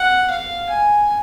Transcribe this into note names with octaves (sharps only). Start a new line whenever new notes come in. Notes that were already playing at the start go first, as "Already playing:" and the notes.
Already playing: F#5
F5
G#5